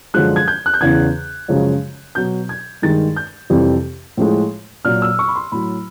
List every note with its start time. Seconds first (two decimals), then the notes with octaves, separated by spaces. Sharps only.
0.14 F#2 D3 F3 G#3 F#6
0.36 G#6
0.48 G6
0.66 F#6
0.74 G6
0.81 E2 C#3 E3 G#6
1.48 F#2 C#3 F3 G#3
2.15 B2 F#3 G6
2.49 G#6
2.82 G2 D#3 G#3 A6
3.16 G6
3.50 F2 C3 E3 G3
4.17 A2 F3 G#3
4.85 A#2 F#3 F6
5.02 E6
5.19 C#6
5.28 B5
5.36 C6
5.52 A2 F#3 B5